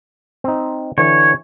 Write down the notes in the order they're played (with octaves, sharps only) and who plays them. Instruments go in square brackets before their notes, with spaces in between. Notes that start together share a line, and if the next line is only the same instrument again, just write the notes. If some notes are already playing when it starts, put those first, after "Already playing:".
[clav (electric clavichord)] C4 D#4
[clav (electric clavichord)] D3 E3 [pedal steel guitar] C#5